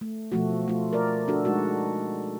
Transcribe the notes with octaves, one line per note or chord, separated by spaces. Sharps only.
A3
B2 F3 A3 F#4
A3 F4
A#4 D5
D4 F#4 A4
G#3 D#4 F#4